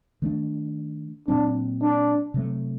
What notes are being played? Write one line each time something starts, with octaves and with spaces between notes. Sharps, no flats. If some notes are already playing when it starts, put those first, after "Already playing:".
D#3 A3 D4
A#2 F#3 C4 D4
D4
C3 F#3 A3